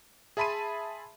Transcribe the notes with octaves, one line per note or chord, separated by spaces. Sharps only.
G#4 E5 A5 B5 C6 D#7